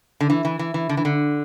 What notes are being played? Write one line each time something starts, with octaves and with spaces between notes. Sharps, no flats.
D3
E3
E3
E3
E3
D3
E3
D3